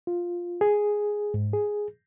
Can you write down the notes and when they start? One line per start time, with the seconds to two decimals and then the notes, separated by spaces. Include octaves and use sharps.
0.07 F4
0.61 G#4
1.34 G#2
1.53 G#4